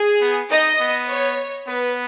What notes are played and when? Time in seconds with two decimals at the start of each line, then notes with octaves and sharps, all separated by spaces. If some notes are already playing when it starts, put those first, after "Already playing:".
Already playing: G#4
0.21 B3
0.51 D#4 D#5
0.80 B3
1.09 C#5
1.67 B3 B4